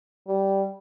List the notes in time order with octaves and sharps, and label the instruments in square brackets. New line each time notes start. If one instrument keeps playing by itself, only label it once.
[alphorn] G3